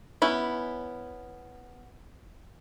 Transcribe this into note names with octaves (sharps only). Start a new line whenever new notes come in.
B3 C#4 E4